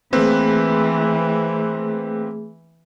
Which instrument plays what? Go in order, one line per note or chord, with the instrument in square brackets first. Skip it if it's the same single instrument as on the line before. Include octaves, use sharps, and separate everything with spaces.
[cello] E3 [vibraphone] A3 G#4 [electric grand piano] A#3 C4 B4